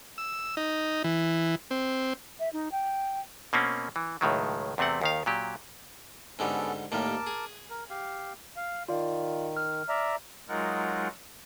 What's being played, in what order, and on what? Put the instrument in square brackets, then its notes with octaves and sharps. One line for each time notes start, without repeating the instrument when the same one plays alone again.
[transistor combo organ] E6
D#4
E3
C4
[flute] E5
D#4
G5
[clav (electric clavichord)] B2 A#3 C4 C#4
E3
C#2 A2 D#3 F#3
E2 C3 A3 C4 F#5
D#2 D#3 F5
A#2 F#3 G4
[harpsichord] G#2 D3 G3 [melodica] B3 C#4 A4
[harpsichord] D#2 A2 G3 [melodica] A#4 A5 D6
[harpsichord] G#4
[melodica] A#4
G4 F5
[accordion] F5
[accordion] D#3 [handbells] F4 D5 F5
[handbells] F6
[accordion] D5 E5 A#5
[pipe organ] F#3 G#3 D#4 F4 A#4 F#5